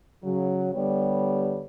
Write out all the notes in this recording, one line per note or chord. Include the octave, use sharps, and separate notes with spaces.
C#3 F#3
D3 G3 B3 G4 C#5